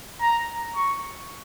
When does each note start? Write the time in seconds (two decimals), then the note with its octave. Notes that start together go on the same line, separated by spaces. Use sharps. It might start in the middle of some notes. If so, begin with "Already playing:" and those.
0.21 A#5
0.76 C#6